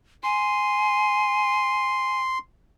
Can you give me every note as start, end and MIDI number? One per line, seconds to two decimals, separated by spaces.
0.24 2.21 80
0.24 2.38 84